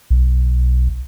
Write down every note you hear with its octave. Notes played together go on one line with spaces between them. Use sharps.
B1